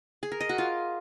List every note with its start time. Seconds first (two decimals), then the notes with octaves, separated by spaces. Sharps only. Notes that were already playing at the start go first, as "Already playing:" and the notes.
0.23 G#4
0.32 A#4
0.40 D#5
0.49 F#4
0.58 F4